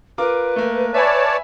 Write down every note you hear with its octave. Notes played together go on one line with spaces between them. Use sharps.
F4 A#4 B4 D6
A3 A#3
C#5 D5 E5 G#5 A5 B5